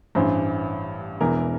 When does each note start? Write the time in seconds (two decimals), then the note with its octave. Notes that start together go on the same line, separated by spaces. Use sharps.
0.15 A1 G2 E3 C5
1.21 E1 E2 E3 A#4